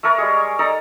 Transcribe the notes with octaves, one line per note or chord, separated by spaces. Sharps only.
A3 A4 A#4 C#5
G3 G#3 G#4
D#4 A4 D5 A#5